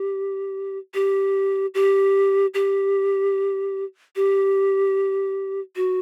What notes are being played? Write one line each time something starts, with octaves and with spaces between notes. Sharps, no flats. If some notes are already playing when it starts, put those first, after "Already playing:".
Already playing: G4
G4
G4
G4
G4
F#4